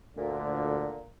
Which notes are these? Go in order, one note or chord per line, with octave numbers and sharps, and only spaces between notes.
D2 A#2 D3